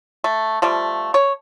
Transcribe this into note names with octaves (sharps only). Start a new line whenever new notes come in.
A3
F3 G3 A3
C#5